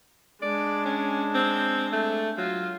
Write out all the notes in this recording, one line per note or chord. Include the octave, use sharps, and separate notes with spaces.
G#3 D4 D5
C#4
C4
A3
F#3 F4